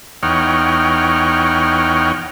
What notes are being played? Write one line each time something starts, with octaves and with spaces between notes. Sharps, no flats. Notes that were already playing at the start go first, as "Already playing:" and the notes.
E2 D#4 C#5 F#5 G5 F6